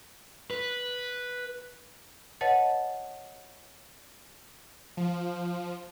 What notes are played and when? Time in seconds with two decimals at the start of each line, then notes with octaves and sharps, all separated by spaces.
0.50 B4
2.41 B4 C#5 D#5 F#5 A5 A6
4.97 F3